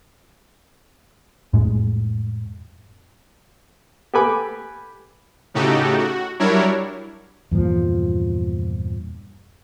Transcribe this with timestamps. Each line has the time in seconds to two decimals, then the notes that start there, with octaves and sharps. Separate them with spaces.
1.53 F2 A2 G#3
4.14 G4 A4 B4 G#5 B5 D6
5.54 A2 C#3 D#4 F#4 G4 A4
5.99 F#4
6.39 F#3 G3 D4 E4 A#4 C#5
7.51 E2 G2 A#2 F3